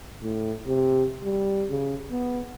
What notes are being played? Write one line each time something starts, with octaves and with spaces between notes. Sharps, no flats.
A2
C3
G3
C#3
B3